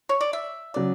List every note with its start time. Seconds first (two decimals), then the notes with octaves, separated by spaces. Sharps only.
0.09 C#5
0.21 D5
0.33 E5
0.74 C#3 F#3 D5